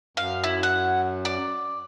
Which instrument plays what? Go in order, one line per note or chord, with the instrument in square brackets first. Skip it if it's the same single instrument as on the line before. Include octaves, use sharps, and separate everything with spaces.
[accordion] F#2 [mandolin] F5
[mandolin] E4
F#5
D5